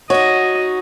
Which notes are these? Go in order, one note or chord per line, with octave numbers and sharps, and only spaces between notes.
D#4 F#4 C#5 D#5